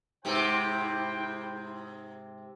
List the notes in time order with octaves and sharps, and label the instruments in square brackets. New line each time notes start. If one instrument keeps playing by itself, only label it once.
[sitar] G#2 C3 G4 [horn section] E4 C5 G5